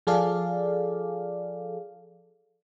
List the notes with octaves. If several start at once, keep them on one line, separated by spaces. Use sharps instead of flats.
F3 G#4 A4 D5 F5